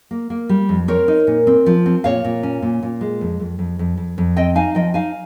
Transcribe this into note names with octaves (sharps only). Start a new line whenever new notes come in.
A#3
A#3
G3
F2
C4 A#4 C#5
D#4
A#2
C4
F3
C4
A#2 C#5 F5
A#2
C#4
A#2
A#2
G#3
F2
F2
F2
F2
F2
F2
C4 D#5 G5
D#4 F5 G#5
F3 D#5 G5
D#4 F5 G#5